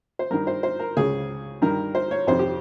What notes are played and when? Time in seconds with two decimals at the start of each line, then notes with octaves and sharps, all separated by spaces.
0.19 C5
0.31 G2 D#3 A#4
0.47 C5
0.63 C5
0.80 A#4
0.96 C#2 C#3 G#4
1.62 G2 D#3 A#4
1.95 C5
2.11 C#5
2.27 F2 C3 D#3 C5
2.39 G4